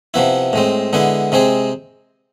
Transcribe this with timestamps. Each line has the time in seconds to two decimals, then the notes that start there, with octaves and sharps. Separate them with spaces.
0.14 C3 F3 B3 E4
0.53 A2 G#3 C4
0.93 D3 G#3 B3 E4
1.32 C3 G#3 C4 G#4